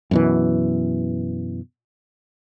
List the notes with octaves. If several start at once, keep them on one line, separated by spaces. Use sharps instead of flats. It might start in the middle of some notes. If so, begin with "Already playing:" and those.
F#2 B2 E3